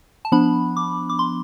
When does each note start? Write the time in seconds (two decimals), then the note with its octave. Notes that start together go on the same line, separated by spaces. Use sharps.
0.25 A5
0.32 F3 B3 D4 B5
0.77 D6
1.10 D6
1.19 C6